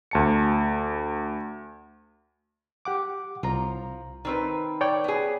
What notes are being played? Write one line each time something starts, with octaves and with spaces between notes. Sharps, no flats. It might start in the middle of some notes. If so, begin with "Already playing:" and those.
D2 A5 C#7
G4 F#5 D6
C2 F3 A#5
D#3 C4 B4
C#5 D5 G5
B3 G#4